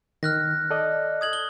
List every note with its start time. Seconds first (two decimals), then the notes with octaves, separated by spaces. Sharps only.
0.23 D#3 F6 F#6 A#6
0.70 A4 D5 D#5
1.21 D#6 G#6 F#7
1.33 G7